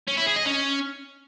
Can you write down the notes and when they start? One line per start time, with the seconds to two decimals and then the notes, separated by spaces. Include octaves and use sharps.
0.08 C#4
0.17 E4
0.26 G#4
0.36 D#5
0.45 C#4